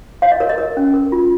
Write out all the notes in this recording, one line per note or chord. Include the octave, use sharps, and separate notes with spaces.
C#5 F5
D#5
A#4 C#5
D#5
A#4
C#4
A#4
F4